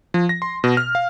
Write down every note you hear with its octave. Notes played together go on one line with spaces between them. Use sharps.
F3
A#6
C6
B2
F6
F5